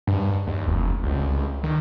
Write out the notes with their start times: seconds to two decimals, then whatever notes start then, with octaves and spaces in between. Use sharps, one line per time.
0.07 G2
0.47 D#2
0.67 F1
1.04 C#2
1.63 D#3